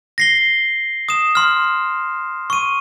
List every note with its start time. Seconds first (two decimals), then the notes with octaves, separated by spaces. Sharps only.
0.18 A#6 C7 G7
1.09 D#6 E7
1.35 C6 F6
2.50 C#6 D#7